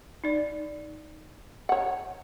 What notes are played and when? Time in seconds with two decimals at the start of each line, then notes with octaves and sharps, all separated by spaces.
0.24 D#4 D5
1.69 C#5 F#5